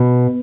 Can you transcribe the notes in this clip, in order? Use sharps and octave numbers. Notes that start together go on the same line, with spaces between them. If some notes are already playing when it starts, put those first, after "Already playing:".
Already playing: B2